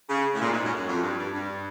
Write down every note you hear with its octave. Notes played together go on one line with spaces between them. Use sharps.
C#3
A2
A#2
G#2
F#2
F#2
F2
G2
G2
G2